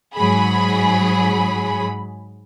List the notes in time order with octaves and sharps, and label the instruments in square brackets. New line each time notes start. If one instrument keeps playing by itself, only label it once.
[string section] G#2 F#3 G#4 B5